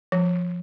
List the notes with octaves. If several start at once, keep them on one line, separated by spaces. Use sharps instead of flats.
F3